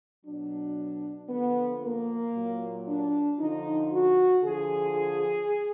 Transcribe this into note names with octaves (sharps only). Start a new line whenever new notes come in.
B2 F#3 D4
D3 F3 B3
A#3
A#2 F#3
D4
D3 F3 D#4
F#4
D3 F3 G#4